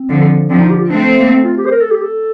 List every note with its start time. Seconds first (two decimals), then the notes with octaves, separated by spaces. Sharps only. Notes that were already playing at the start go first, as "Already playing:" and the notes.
Already playing: C4
0.09 D3 F3
0.49 D3 F3 C4
0.60 D#4
0.70 G4
0.80 F4
0.90 A3 C4 D4
1.17 A#3
1.31 C4
1.44 F4
1.57 G4
1.66 C5
1.71 A#4
1.81 A4
1.91 G4
2.02 A4